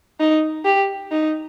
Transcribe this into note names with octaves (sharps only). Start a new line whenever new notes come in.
D#4
G4
D#4